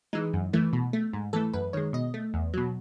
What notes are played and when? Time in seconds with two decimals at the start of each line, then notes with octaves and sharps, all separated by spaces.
0.13 E3 G#3 D#4
0.33 F#2
0.53 E3 A3
0.73 B2
0.93 A3
1.13 G#2
1.33 E3 A3 A4
1.53 F#2 B4
1.73 D#3 G#3 C#5
1.93 B2 D#5
2.14 A3
2.34 E2
2.54 B2 F#3